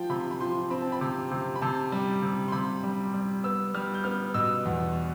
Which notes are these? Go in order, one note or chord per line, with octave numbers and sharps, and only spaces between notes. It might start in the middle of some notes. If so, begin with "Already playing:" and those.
Already playing: F3 G5
C3 B5
B5
F3 C6
C4 B5
A5
B5
C3
C3
B5
C3 A5
G3
C3
C6
C3 B5
G3
G3
B3 E6
G3 F6
G6
B3 F6
B2 E6
E2